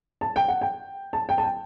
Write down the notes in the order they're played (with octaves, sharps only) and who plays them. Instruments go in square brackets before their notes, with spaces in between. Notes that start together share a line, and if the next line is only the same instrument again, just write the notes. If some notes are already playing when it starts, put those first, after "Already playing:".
[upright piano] A5
G5
F#5
G5
A5
G5
A5
G5